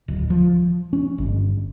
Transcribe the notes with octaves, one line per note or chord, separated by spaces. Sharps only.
D1
F3
C#4
G1